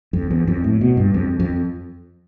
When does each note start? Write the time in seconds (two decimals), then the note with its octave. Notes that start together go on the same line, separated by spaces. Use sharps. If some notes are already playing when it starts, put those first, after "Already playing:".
0.13 F2
0.31 E2
0.47 F2
0.64 A2
0.81 B2
0.97 G2
1.14 F2
1.40 F2